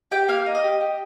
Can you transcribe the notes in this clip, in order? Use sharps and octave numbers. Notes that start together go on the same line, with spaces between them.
G4 G5
A#3 F5
D#4
D#5
G4
G4